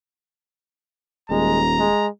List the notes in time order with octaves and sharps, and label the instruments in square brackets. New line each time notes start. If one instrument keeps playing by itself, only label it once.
[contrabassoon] D#1 [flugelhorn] G#3 [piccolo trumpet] A#5
[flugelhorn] G#3